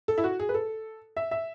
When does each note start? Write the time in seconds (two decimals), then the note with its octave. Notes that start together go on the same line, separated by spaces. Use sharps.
0.08 A4
0.18 E4
0.24 F#4
0.40 G#4
0.49 B4
0.54 A4
1.17 E5
1.31 E5